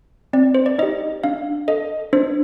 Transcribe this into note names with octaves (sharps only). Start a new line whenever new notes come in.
C4 D5
C5
D5
D#4 G4 D#5
D4 F5
A4 D#5
D4 C5